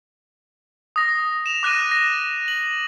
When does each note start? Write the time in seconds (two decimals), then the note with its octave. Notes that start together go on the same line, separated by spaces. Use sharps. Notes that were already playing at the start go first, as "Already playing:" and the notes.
0.96 D#6 A#6
1.46 E7 F7
1.63 D6 F#6 A#6 D#7
1.91 A#6
2.48 F#7